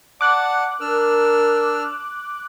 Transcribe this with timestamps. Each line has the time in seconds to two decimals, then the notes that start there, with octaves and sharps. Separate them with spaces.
0.21 D5 F#5 A5 D6 F#6
0.81 D4 A#4 E6 F6